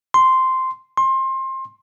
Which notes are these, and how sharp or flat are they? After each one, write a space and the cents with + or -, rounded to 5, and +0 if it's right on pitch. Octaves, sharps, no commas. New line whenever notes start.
C6 -5
C6 +25